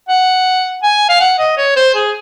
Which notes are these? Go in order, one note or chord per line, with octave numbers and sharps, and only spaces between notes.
F#5
G#5
F5
F#5
D#5
C#5
C5
G#4